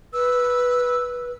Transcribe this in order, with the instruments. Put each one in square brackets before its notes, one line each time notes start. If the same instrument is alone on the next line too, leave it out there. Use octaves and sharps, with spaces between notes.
[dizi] B4 [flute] E6